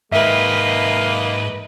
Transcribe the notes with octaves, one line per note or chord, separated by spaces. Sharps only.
G#2 D#3 G#3 A#3 G4 B4 D#5 E5